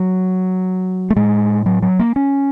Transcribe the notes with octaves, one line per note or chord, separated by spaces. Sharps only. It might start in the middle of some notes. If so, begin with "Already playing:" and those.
Already playing: F#3
A3
A2 G#3
F#3
F#3
A#3
C#4